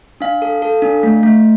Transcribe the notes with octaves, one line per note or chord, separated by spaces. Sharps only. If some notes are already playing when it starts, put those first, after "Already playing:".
D4 F5
A4
A4
D4
A3
A3